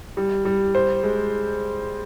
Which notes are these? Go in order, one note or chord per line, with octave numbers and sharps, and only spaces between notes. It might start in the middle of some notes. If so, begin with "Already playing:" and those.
G3
G3
C5
G#3